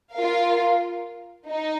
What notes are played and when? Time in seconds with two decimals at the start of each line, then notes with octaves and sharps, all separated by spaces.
0.13 F4 A#4 F5
1.48 D#4